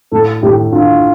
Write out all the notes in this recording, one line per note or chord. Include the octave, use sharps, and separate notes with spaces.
A2 A4
A2 G4
D4 F4